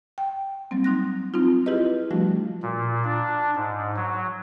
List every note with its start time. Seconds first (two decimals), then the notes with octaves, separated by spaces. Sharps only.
0.18 G5
0.71 F#3 G3 A#3 C4
0.84 F#3 D#4 C6 F#6 A#6
1.34 C4 D#4 F4
1.66 E4 F4 G4 G#4 B4 D#5
2.11 F3 G3 A3 D4 F#4
2.62 A#2
3.04 D4
3.56 G#2
3.96 F#3